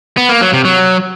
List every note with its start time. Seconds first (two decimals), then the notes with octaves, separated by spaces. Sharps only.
0.17 B3
0.29 A#3
0.41 F#3
0.53 C3
0.65 F#3